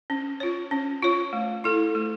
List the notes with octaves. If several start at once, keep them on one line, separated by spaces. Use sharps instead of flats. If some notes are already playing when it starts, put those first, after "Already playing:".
C#4
F4 C#5
C#4
F4 C#5
A3
E4 A4
A3